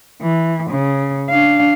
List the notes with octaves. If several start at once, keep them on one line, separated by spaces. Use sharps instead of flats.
E3
C#3
D4 F5